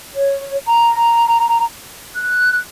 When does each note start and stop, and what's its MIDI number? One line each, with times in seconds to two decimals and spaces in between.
0.13 0.56 73
0.66 1.63 82
2.16 2.58 90